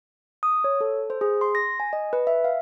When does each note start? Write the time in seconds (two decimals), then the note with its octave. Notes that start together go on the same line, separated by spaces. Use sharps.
0.43 D#6
0.64 C#5
0.81 A4
1.10 C5
1.21 G#4
1.41 C6
1.55 A#6
1.80 G#5
1.93 D#5
2.13 B4
2.27 E5
2.44 F5